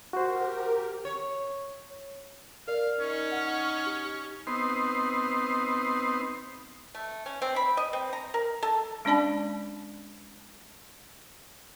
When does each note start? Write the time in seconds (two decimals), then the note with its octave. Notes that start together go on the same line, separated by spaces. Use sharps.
0.13 F#4 G4 A#4 C5
1.05 C#5
2.68 A#4 D5 F5
3.00 C#4 D#4
3.32 F#5 F6
3.86 G4
4.47 B3 C4 D#4 C6
6.94 A3
7.26 C#4
7.42 C4
7.56 B5
7.77 D#5
7.93 C4
8.13 A#5
8.34 A#4
8.63 A4
9.05 G#3 C#4 D4 D5 A5 B5